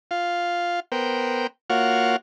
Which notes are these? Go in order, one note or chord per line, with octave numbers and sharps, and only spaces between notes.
F4 F5
B3 A#4 C5 G5
A#3 F4 F#4 C#5 F#5 F6